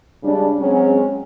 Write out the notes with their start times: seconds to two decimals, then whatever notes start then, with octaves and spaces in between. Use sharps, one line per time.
0.23 C#3 G3 G#3 D4
0.60 F#3 G#3 C4 C#4